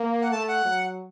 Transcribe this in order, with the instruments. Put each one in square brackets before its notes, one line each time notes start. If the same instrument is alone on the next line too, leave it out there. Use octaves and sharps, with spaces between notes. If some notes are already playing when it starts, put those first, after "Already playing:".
Already playing: [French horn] A#3
[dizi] F#5
[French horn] A3 [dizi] A5
[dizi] F#5
[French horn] F#3